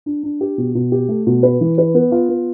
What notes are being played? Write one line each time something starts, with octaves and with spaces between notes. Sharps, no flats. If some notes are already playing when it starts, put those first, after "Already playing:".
D4
D4
G4
B2
B2
G4
A3
B2
B4
E3
B4
B3
F4
B3